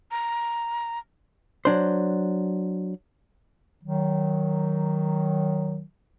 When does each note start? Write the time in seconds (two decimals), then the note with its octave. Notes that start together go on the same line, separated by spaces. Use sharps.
0.11 A#5
1.65 F#3 D4 C5
3.83 D#3 F#3